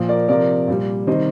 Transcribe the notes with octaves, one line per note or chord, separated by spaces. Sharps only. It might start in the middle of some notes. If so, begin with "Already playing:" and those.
Already playing: A#2 F3
A#4 D5
C3 F3 A#4 D5
A#2 G3
C3 D#3 G3 C5 D#5